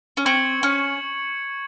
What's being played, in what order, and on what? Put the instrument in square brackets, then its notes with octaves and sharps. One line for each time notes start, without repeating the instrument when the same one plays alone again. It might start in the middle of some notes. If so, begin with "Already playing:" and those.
[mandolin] C#4
[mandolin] C4 [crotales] C#6 G#6 C#7 F#7
[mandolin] C#4